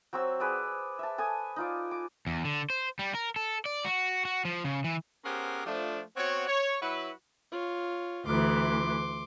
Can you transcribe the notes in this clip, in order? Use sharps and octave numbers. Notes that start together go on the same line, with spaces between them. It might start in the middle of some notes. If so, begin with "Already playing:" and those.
F#3 C4 C#5 E6
G#4 B4 D5 E6
E5 A5
A4 G#5 D#6
D#4 F4 D5
D6
E2
D3
C5
G3
A#4
A4
D5
F#4
F#4
F3
C#3
E3
B3 C#4 G4 G#4 A#4 C5
F3 A3 D4
B3 C4 F#4 C#5
C#5
F#3 E4 F#4 B4
F4 C#5
D2 E3 C6 D6